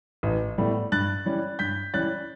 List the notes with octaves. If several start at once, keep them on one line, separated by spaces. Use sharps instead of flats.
A1
A2 G3 B3
G2 F#6 A6
E3 G3 C#4
G2 G6 B6
E3 G3 C#4 F#6 A6